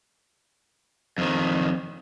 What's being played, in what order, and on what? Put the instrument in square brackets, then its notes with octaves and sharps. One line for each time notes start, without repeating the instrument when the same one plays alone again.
[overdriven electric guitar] F2 D#3